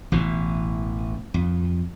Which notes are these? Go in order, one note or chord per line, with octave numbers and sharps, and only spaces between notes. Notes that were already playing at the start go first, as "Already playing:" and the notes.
A1 B2 E3
F2